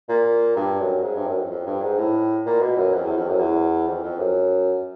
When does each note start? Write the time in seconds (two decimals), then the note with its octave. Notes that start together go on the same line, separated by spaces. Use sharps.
0.09 A#2
0.56 G2
0.80 F#2
1.03 G#2
1.15 G2
1.27 F#2
1.39 F2
1.51 F2
1.66 G2
1.82 G#2
1.99 A2
2.46 A#2
2.61 B2
2.77 F#2
2.94 F2
3.05 E2
3.17 F2
3.29 F#2
3.40 E2
3.88 F2
4.03 F2
4.19 F#2